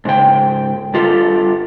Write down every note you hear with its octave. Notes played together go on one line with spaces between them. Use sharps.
G#2 C#3 G5
G2 F4 G4 A4